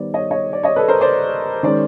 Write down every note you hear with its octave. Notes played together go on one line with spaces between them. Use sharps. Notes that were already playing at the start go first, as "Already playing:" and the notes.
Already playing: D#3 G3 B3 C5 D5
C#5 D#5
C#5 D#5
D5
C#5 D#5
A4 B4
A#4 C5
C5 D5
D#3 G#3 C#4 C5 D5